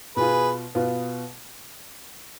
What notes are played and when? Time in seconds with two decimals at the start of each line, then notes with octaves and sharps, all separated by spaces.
0.16 B2 B3 F4 G#4 B4
0.75 B2 B3 F4